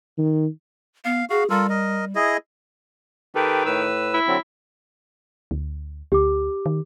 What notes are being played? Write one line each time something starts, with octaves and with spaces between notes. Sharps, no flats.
D#3
B3 F5
F#4 G#4 F5
G3 F4 A4 A#4
A#4 D#5
E4 G#4 D#5
D#3 G4 A4 B4
A2 B4 E6
E4
D3 F#3 C4
D2
D2 G4 D6
D#3